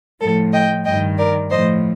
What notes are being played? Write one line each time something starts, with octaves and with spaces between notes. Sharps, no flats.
A2 F3 A4
D#5 G5
G2 D#3 D#5 G5
A#4 D5
A2 F3 C5 D#5